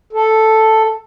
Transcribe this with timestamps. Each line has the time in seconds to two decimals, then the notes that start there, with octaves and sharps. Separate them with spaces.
0.13 A4